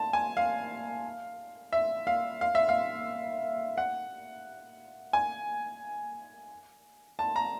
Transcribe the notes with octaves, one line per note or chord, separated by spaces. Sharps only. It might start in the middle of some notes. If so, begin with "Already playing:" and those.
Already playing: A5
G#5
F5
E5
F5
F5
E5
F5
F#5
G#5
A5
A#5